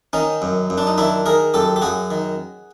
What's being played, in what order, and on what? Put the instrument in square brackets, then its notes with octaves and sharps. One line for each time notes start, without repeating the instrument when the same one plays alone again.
[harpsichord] D#3 C#4 D#4
F#2
F#2
D4
D#4
D#3 D4 E4
D#3 G#4 A#4
F#2 G4 A4
G4
F#2 F#4 G#4
D#3